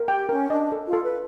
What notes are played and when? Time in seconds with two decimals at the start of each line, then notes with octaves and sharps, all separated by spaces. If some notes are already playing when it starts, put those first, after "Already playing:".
Already playing: A#4
0.08 G4 G5
0.29 C#4 A#4
0.50 D4 D#5
0.72 A4
0.87 F4
0.93 A4
1.03 B4